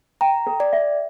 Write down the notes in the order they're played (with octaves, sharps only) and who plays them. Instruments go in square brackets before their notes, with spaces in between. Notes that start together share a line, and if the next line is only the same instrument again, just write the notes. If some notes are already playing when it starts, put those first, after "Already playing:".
[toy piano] G5 [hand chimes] A#5
[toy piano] A4
[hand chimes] D5
[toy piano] E5